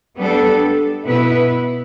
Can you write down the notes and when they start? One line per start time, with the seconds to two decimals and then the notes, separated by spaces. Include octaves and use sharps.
0.17 G3 B3 D4 A4
1.05 B2 B3 E4 B4